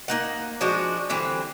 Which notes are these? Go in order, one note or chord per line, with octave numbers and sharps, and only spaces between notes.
A#3 D#4 F#5
F3 G#3 D4 F#4
D3 E3 G3 C4